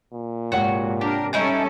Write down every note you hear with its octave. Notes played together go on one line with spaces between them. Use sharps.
A#2
G#2 C3 F#4 C#5 F#5
D4 G4 A#4
G3 C#4 D#4 E4 G#4 A4